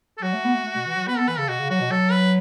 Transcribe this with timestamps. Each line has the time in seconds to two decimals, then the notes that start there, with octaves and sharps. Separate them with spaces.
0.18 A4
0.23 F#3 F#4
0.33 A3
0.45 B3
0.54 A3
0.65 A3
0.76 B2
0.86 E3
0.96 F#3
1.07 B3 B4
1.18 B3 A4
1.28 E3 B4
1.38 C#3 A4
1.49 B2 F#4
1.60 C#3
1.70 F#3 F#4
1.81 B2
1.91 F#3 A4
2.12 B4